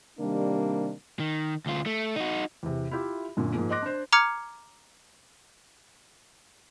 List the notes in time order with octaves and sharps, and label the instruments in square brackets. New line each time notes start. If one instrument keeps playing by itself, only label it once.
[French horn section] C3 D#3 G3 A#3 D4
[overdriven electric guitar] D#3
D2 F4
A3
D#4 F#4
[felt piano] E2 C3
E4 F4 G4 E5
F#2 A#2 D3
G#2 F3 G#3 A#3
D#5 C6 D6 F#6 A#6
D4 C5
[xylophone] A#5 D6 F6 G#6 C#7